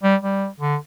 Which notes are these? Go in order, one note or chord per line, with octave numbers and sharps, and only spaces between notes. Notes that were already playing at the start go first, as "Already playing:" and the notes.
G3
G3
D3